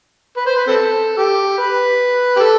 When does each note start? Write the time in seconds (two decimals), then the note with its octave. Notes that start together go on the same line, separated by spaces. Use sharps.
0.37 B4
0.46 C5
0.57 B4
0.67 C4 A4
1.17 G4
1.58 B4
2.36 G4
2.40 A4